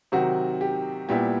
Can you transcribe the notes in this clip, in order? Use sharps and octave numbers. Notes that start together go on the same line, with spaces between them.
C3 D#3 F#3 F#4
G4
A#2 G3 B3 E4 G4